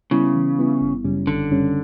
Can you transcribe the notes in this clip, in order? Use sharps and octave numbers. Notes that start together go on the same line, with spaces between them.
C#3 G3 B3 E4
E3
G3 B3 E4
G1
F#2 C#3 G3 C#4
G1 D3
F#2 C#3 G3 C#4